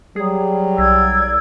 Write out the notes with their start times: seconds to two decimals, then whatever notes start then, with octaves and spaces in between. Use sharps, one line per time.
0.16 F#3 G3 G#4
0.78 B1 D5 E6 G#6